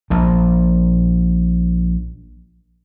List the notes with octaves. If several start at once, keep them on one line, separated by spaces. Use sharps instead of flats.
A#1 A#2